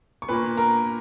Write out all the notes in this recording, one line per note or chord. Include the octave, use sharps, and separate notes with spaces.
C#6
A#2 A#3 B4 B5
A#4 A#5